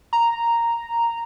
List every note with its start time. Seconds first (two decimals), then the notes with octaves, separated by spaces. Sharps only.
0.13 A#5